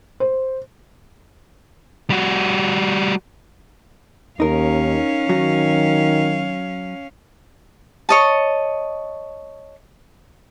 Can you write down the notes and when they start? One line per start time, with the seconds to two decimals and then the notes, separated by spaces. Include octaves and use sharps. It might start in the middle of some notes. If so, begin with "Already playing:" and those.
0.20 C5
2.10 G3 F#4
4.40 D#2 C#4 D#4 A#4 F5
5.29 D#3 F#3 F#4
8.09 C#5 D#5 A5